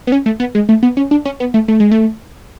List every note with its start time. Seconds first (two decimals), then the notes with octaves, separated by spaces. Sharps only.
0.07 B3
0.12 C#4
0.26 A3
0.40 B3
0.55 G#3
0.69 A3
0.83 B3
0.97 C#4
1.11 D4
1.25 C#4
1.40 B3
1.54 A3
1.68 A3
1.80 G#3
1.91 A3